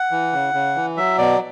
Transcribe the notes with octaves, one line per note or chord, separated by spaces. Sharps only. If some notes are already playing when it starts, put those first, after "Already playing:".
Already playing: F#5
E3
C#3
C#3
E3
F#3 E5
B2 D5